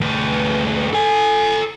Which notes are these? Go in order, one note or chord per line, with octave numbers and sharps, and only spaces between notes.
D2 B4
A4 G#5